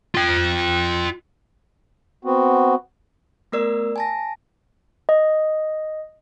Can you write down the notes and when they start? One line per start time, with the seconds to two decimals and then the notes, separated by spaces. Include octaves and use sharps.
0.15 F4 G5
2.25 B3 C4 F#4
3.52 A3 B3 A#4 D5 E6
3.96 G#5 A5 A#6
5.09 D#5